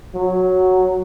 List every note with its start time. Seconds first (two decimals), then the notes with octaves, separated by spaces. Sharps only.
0.15 F#3